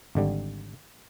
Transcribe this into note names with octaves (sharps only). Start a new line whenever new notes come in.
G#1 D3 G3